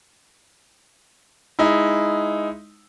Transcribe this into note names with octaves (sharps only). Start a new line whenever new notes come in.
G#3 D#4 E4